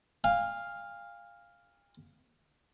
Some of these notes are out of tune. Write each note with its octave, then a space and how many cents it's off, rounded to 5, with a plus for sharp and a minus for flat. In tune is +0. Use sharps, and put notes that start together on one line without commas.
F5 +0 G#5 -45